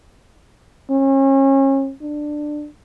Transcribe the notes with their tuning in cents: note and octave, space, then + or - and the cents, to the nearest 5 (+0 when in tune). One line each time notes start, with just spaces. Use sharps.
C#4 -35
D4 +15